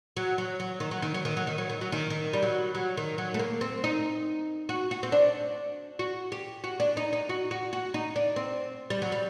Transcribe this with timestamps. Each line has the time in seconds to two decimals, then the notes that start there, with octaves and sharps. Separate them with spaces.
0.17 F#3
0.38 F#3
0.60 F#3
0.80 D#3
0.91 F#3
1.02 D#3
1.14 F#3
1.25 D#3
1.37 F#3
1.47 D#3
1.58 F#3
1.70 D#3
1.81 F#3
1.92 D#3
2.10 D#3
2.33 G3
2.43 F#3
2.75 F#3
2.97 D#3
3.18 F#3
3.34 A3
3.39 A#3
3.61 C4
3.84 D#4
4.69 F#4
4.91 F#4
5.03 C4
5.12 D4
5.99 F#4
6.32 G4
6.64 F#4
6.80 D4
6.97 D#4
7.13 D#4
7.29 F#4
7.51 F#4
7.73 F#4
7.94 D#4
8.16 D4
8.36 C4
8.90 G3
9.02 F#3
9.12 G3